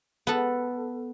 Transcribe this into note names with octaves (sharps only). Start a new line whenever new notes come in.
B3 A4